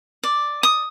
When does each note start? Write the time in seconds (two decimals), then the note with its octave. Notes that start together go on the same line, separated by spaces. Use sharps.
0.24 D5
0.63 D#6